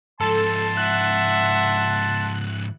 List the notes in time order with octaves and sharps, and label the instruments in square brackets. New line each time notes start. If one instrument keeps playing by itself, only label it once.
[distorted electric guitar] G#2 F3 [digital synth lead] A4 [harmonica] A5 C6
[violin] E5 F#5 [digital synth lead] F#6